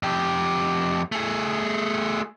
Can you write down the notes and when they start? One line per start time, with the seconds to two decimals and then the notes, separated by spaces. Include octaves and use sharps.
0.03 F2 G4
1.12 A3 G#4